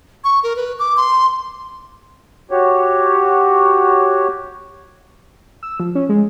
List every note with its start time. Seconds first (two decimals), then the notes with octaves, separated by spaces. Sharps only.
0.24 C#6
0.44 A#4
0.56 B4
0.79 D6
0.97 C6
2.51 F#4 G4 C#5
5.63 E6
5.80 F3
5.95 C#4
6.09 G#3